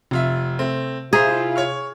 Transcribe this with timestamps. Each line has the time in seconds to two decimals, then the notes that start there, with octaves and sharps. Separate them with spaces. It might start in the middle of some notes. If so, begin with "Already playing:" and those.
0.11 F1 C3 F4 E5
0.59 A3 C4
1.13 E4 F4 G#4 C5 E5 A#5
1.56 C#5 C#6 F6